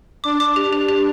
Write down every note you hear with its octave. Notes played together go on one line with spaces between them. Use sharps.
D4 D6
D6
G4
G4
G4